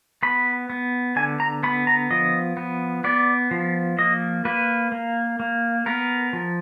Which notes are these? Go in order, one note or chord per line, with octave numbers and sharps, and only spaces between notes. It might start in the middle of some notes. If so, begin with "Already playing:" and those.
B3 B5
B3
D3 G#5
A#5
B3 B5
A#5
F3 D#5
B3
B3 D5
F3
A#3 D#5
A#3 B4
A#3
A#3
B3 A#4
F3